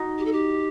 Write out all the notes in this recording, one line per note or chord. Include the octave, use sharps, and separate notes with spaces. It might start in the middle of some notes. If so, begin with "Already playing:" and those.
Already playing: D#4 F#4
G4
A4
G4